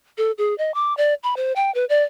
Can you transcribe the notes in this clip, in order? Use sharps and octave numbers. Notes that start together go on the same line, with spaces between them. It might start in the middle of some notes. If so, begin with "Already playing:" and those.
A4
G#4
D#5
D6
D5
B5
C5
G5
B4
D5